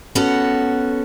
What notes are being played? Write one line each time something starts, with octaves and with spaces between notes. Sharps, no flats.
B3 C#4 F#4 A4